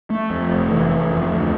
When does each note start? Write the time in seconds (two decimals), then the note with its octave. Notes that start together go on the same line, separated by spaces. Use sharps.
0.10 A3
0.30 F2
0.51 F1
0.70 E3
0.90 A3
1.11 F2
1.31 D2